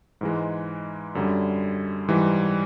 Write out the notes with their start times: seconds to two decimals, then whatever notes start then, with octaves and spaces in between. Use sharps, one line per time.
0.21 G#2 E3 G#3
1.15 F#2 D3 G3
2.08 G#2 E3 G3